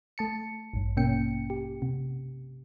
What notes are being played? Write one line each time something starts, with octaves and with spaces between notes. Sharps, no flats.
A3 A5 C#7
A1 G2
B2 A#3 C#4 G5 C#7
G4
C3